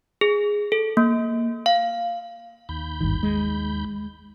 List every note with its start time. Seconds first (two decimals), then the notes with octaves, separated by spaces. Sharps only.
0.21 G#4
0.72 A4
0.97 A#3
1.66 F5
2.69 D#2 B5 G6
3.00 G#1 G2 D#3
3.23 G#3